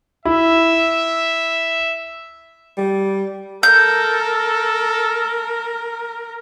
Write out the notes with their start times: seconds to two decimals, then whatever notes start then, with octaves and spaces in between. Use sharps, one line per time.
0.25 E4 E5
2.77 G3
3.63 A4 A#4 G6